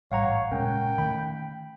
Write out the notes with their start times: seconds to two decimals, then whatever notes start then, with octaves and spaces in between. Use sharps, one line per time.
0.12 A1 G#2 G3 C#5 F5 F#5 A#5
0.51 A#2 C#3 G#3 C#4 A#4 G5
0.98 D#3 A3 B5